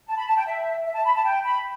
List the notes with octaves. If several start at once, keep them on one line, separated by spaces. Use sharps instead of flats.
A5
B5
A5
G5
E5
E5
A5
B5
A5
G5
B5